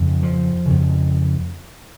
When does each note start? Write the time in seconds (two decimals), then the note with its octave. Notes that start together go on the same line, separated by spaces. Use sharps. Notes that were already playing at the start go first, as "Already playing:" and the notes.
Already playing: F2 C#3
0.23 F3
0.66 F2 C#3